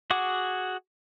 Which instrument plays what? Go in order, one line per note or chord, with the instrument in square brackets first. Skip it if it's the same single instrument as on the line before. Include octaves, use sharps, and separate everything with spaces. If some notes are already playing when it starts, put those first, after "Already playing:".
[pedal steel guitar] F#4 G#4 F#5 D6